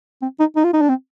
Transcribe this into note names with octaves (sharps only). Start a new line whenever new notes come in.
C4
D#4
D#4
F4
D#4
D4
C4